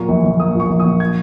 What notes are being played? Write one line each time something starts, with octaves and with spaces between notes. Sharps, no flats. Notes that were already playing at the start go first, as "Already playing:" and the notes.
Already playing: A#2 F#3 A#3 C#6
A#1
A#1
A#3 D#6
A#2 C#6
A#1
D#6
A#1
G#6